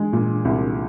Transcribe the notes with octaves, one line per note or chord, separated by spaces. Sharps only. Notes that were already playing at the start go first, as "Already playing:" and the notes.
Already playing: G#3
A#2
C2